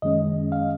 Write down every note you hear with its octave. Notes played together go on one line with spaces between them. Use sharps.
F#2 D#3 G#3 C#4 D#5
F5